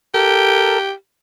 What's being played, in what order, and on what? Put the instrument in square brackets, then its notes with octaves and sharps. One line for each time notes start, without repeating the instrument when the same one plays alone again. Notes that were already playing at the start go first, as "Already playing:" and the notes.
[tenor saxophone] G4 [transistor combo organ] A4 A#4